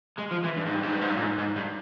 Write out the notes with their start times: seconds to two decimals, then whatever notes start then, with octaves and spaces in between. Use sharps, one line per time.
0.18 G#3
0.31 F3
0.44 E3
0.57 G2
0.66 G#2
0.74 G2
0.83 G#2
0.92 G2
1.01 G#2
1.10 G2
1.17 A#2
1.22 G#2
1.38 G#2
1.56 G2